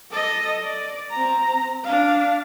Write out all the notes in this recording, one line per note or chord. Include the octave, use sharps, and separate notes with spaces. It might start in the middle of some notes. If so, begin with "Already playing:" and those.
A4 D#5
D5
C4 A#5
D4 F5